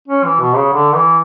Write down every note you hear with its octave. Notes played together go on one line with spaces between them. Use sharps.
C#4
E3
B2
C#3
D3
E3